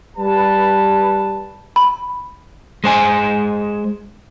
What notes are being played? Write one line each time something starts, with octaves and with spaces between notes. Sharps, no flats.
G3 B4 A5
B5
G#3 C5 G#5